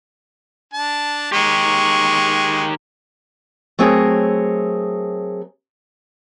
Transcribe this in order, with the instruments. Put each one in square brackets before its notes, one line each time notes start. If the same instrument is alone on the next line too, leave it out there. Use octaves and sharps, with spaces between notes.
[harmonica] D4 A5
[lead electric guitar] D#3 G4 [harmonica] G#3 C#6
[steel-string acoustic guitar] F#3 A3 C4 G#4 A#4 C#5